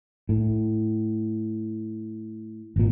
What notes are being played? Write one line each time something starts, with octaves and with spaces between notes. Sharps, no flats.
A2
G#1 A#2